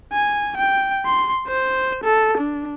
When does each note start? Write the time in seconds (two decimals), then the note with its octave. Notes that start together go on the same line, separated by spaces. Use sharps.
0.13 G#5
0.56 G5
1.06 C6
1.47 C5
2.03 A4
2.37 D4